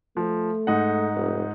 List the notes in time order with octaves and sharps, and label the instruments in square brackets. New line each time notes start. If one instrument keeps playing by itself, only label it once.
[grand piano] F3 [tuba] A3
[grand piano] G#2 D#4 F#5
[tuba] F1